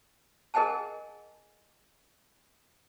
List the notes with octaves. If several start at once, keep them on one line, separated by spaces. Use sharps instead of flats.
G#4 A#4 D#5 F#5 G#5 A5